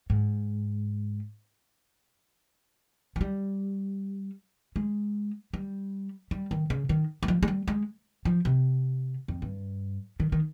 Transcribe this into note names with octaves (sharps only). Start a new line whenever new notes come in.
G#2
F3
G3
G#3
G3
G3
D#3
C#3
D#3
G3
F3
G#3
G3
G#3
F3
C3
F2
G2
D#3
D#3